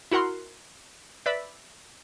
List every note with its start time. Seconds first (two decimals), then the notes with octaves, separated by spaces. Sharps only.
0.11 E4 F#4 A#4 F#5 C6
1.26 B4 D5 E5 B5